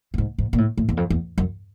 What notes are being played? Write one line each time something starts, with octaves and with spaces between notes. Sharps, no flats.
A2
G#2
G#2
A#2
A2
A2
E2
F2
E2
F#2